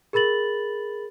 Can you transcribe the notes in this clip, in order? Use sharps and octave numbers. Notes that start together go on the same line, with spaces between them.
G#4 A#4 B5 A6 F#7